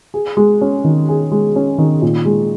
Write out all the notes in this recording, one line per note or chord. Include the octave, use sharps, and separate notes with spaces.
G#4
G#3
C#4
D#3
G#4
G#3
C#4
D#3
A#2
G#3